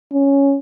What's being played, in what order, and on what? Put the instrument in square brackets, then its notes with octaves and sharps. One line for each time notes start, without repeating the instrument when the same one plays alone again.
[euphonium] C#4